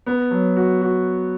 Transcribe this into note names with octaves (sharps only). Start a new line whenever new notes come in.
B3
F#3
F#4
F#4